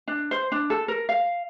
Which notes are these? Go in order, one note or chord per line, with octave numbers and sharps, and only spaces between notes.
D4
C5
D4
A4
A#4
F5